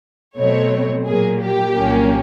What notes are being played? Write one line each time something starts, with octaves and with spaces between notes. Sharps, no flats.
B2 F#3 A3 C4 C#5
A#2 F#3 A#3 G#4
G4
C2 A#2 F#3 A#3 C#4